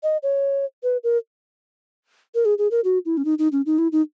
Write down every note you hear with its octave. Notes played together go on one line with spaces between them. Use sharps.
D#5
C#5
B4
A#4
A#4
G#4
G#4
A#4
F#4
E4
C#4
D#4
D#4
C#4
D#4
E4
D#4